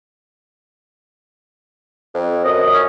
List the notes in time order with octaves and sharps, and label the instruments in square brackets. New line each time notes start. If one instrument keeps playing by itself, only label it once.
[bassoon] F2
[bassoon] F#2 [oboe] D#5
[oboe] C#4